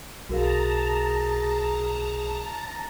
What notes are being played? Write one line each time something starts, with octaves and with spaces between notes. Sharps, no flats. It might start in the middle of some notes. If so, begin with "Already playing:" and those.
B1 F#4 G#4 A#4 F5 A5 A#5